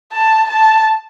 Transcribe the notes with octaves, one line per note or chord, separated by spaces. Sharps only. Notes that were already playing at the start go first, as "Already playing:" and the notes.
A5
A5